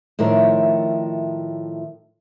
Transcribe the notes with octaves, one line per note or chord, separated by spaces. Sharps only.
A2 D#3 F3 A#4 C#5 E5